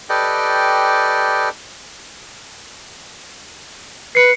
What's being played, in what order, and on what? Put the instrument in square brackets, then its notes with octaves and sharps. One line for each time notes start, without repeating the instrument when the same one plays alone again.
[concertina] G4 A4 B4 D5 D#5 G5
[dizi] B4 [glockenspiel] C7 C#7